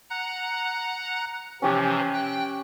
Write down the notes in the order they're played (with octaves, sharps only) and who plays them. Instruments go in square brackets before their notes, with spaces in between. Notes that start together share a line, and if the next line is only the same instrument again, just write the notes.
[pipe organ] F#5 A#5 F#6
[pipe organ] C3 E3 F3 [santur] C#4 G4 G#5
[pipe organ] G5 F#6